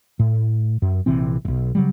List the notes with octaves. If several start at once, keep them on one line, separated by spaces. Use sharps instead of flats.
A2
F#2
A#1 C3 E3 C4
E1 B1
C#3 F#3 G3